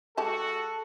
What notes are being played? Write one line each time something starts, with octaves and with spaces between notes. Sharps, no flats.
G#3 F#4 G4 A4 A5